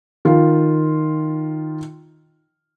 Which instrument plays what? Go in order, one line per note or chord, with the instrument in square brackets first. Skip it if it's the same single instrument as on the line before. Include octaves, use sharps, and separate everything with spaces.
[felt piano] D#3 F4